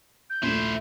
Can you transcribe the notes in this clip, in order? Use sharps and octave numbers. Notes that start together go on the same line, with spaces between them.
G6
A#1 D#2 A3 E4 C5